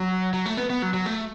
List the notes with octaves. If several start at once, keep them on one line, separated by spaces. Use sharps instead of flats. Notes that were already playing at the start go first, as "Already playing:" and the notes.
Already playing: F#3
F#3
A3
B3
B3
F#3
F#3
A3